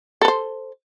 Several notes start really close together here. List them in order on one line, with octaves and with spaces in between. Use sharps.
A4 B4 C5